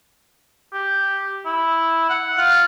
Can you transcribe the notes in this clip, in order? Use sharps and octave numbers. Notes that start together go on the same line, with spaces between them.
G4
E4
F#5
F4